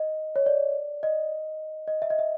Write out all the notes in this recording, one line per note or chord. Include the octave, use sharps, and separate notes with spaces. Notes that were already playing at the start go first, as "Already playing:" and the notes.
Already playing: D#5
C#5
D5
D#5
D#5
E5
D#5
E5